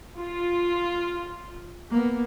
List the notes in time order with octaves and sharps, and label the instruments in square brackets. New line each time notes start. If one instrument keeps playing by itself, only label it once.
[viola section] F4
[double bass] A#3 B3